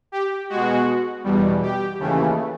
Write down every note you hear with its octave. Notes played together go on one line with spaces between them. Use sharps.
G4
B2 G#3 F#4
E2 B2 G3
G4
D#2 C#3 E3 A3